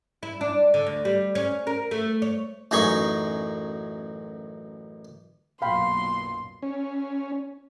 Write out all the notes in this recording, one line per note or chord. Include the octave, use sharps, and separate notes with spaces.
E4
D4
D3
D2
G3
C#4
A#4
A3
C#5
A1 F#2 D#4 G#4 B5 C#6
B1 F#2 A#2 F5 G5 B5 C6
C#4